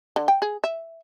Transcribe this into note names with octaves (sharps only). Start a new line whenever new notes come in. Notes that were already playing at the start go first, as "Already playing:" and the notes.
D3
G5
G#4
E5